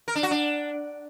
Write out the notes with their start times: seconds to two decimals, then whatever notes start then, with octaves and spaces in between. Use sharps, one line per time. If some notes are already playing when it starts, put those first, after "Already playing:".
0.08 A#4
0.15 D4
0.23 F#4
0.31 D4